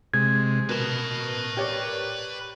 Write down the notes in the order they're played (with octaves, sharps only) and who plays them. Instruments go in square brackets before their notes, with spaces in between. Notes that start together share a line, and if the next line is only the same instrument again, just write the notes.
[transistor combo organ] C3 G#3 [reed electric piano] G#6
[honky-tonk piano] B2 [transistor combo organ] A#4 [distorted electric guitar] B4 A5
[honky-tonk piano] G4 C#5 D5